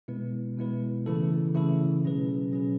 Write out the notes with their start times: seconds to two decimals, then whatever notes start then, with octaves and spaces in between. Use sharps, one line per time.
0.08 B2 G#3 B3 E4 B4
0.58 B2 G#3 B3 E4 B4
1.06 C#3 E3 A3 E4 A4
1.54 C#3 E3 A3 E4 A4
2.04 B2 F#3 C#4 G#4 B4
2.51 B2 F#3 C#4 G#4 B4